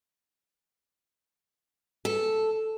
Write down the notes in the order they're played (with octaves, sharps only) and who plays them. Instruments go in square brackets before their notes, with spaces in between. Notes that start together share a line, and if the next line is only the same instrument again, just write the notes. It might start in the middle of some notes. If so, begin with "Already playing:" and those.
[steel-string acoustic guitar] A4